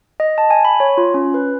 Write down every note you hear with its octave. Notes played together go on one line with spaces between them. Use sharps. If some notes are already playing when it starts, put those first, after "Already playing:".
D#5
A5
G#5
B5
C#5
F4
C#4
B4